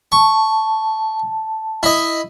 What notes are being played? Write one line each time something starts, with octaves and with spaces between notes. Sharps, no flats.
A5 C#6
E4 D#5